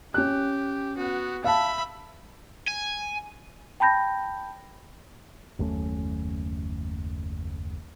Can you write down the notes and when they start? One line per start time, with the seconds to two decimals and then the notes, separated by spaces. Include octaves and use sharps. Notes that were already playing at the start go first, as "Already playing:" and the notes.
0.14 C#4 G4 F#6
0.97 B3 F#4
1.44 E5 F5 A5 B5
2.68 G#5
3.80 G5 A5 B5 G6 A#6
5.59 F#1 D#2 A3 C#4